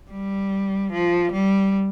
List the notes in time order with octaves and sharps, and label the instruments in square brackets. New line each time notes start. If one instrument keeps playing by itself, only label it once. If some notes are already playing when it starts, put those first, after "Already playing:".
[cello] G3
F3
G3